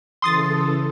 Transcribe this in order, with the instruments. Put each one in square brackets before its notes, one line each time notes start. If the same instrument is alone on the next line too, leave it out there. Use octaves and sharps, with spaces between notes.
[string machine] C#3 E3 A4 [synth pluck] C6 D#6 A6